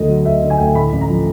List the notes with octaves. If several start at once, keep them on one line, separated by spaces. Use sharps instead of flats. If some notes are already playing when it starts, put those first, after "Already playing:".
Already playing: D2 D3 D#5
F#3
D2 E5
D3
G#5
D2 G5
G#5
A2 B5
A1
A#5
F3